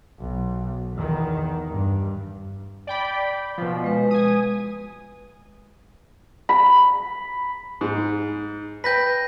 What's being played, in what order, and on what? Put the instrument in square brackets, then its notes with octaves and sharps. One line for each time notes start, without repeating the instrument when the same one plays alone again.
[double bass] B1
E2 D#3
G2
[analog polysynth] D5 G5 B5
B2 F3
[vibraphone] G#3 B4
[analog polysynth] G#5 D#6
[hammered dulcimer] B5
[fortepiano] G#2
[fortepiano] B4 G5 [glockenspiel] G6 A#6 B6